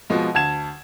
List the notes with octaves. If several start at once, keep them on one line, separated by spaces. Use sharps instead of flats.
B2 F3 G#3
D2 A5 G#6 E7